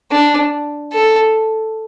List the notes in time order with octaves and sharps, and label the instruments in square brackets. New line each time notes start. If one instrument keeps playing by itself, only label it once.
[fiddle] D4
A4